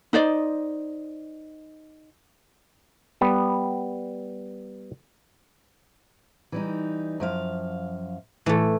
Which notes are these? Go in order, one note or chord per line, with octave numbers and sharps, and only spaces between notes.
D#4 C5 D5 D#5
G3 B3
E3 G3 D#4
F#2 F3 F5
A2 E3 A3